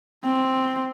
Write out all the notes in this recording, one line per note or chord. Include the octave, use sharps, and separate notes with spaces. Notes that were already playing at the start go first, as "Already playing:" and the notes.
C4